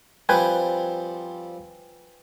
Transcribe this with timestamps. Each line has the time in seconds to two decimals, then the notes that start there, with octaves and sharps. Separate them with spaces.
0.29 F3 G3 C4 B4 G5 G#5